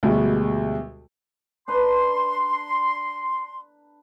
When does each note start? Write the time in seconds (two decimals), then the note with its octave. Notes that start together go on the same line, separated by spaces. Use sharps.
0.03 D2 B2 G3 G#3
1.68 D4 B4 A#5 C6